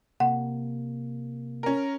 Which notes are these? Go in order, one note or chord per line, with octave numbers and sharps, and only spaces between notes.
C3 A#3 F#5
C#4 A#4